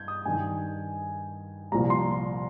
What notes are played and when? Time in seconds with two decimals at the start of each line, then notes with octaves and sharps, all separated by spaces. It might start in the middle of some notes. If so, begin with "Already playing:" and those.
Already playing: G2 G6 G#6
0.08 D#6
0.25 G2 D#3 G#5
1.72 C2 A#2 F3 A#5
1.90 C6